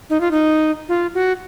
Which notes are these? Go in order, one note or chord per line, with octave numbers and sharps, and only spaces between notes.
D#4
F4
D#4
F4
F#4